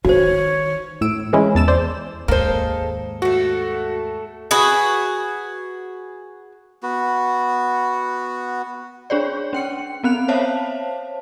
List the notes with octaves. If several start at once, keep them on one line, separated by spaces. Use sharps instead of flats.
D#3 F#4 C5 C#5
A2 E6 D7
E3 G#3 C#4 E4
E2 A5 E6 E7
C5 D5
D#2 G#2 G#3 A#3 A4 C5
A3 F#4 A4
F#4 G#4 B4
B3 F#4
D4 G#4 C#5 D5
C#4 G5 C#7
B3 C4 F#6 F7
C5 C#5 E5 F5 A5